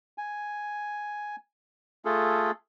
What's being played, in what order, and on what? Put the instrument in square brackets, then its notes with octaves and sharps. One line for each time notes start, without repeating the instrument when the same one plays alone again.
[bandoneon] G#5
A3 F4 G#4 A4